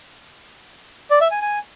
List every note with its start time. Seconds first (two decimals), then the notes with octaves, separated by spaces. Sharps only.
1.11 D5
1.21 E5
1.31 G#5
1.42 G#5